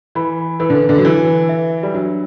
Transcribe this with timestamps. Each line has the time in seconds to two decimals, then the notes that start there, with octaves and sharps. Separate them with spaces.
0.15 E3 B5
0.60 E3 B4
0.70 D3
0.89 D3
0.98 F#3
1.05 E3 B4
1.49 E5
1.83 G3
1.94 F#3 D4